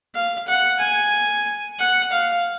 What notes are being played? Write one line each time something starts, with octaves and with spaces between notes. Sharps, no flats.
F5
F#5
G#5
F#5
F5